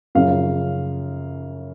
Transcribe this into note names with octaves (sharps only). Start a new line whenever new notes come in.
F#2 C#3 F3 F5